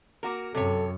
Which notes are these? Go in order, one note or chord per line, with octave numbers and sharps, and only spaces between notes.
A#3 F#4 A#4
F#2 C3 A4 C#5